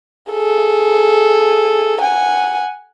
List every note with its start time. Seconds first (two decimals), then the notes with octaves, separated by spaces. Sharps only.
0.31 G#4 A4
2.01 F#5 G#5